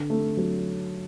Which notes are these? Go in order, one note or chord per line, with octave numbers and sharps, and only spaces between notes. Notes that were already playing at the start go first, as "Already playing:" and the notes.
Already playing: D3
A3
F#3